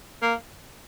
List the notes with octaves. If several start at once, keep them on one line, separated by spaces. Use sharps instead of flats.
A#3